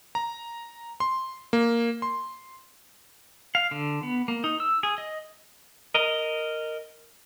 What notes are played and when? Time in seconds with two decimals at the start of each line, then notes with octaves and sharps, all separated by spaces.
0.15 A#5
1.00 C6
1.53 A#3
2.02 C6
3.55 F5
3.71 D3
4.03 B3
4.28 A#3
4.44 D#4
4.60 E6
4.83 G#4
4.98 D#5
5.94 A#4 D#5